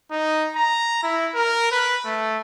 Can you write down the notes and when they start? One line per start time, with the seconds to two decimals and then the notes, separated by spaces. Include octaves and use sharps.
0.11 D#4
0.56 A#5
1.03 E4
1.35 A#4
1.72 B4
2.05 A3